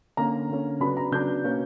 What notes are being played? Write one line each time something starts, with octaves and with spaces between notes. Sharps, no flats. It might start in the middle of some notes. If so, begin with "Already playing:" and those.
D3 A#3 C#4 A#5
D3 A#3 C#4
C#3 F#3 B3 D4 B5
A#5
C#3 F#3 B3 D4 G6
B2 A#3 C#4